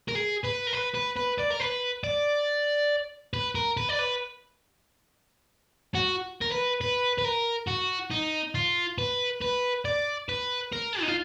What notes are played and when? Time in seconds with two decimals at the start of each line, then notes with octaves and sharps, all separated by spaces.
0.08 A#4
0.15 G#4
0.44 B4
0.67 A#4
0.73 B4
0.95 B4
1.16 B4
1.38 D5
1.50 A#4
1.60 B4
2.04 D5
3.34 B4
3.55 A#4
3.77 B4
3.89 D5
3.99 B4
5.95 F#4
6.42 A#4
6.52 B4
6.81 B4
7.18 B4
7.25 A#4
7.68 F#4
8.11 D#4
8.55 F4
8.98 B4
9.42 B4
9.85 D5
10.29 B4
10.72 A#4
11.01 D#4
11.08 F4